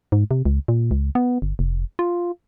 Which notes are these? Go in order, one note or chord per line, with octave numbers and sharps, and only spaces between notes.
G#2
C3
C#2
A#2
C#2
B3
G1
F1
F4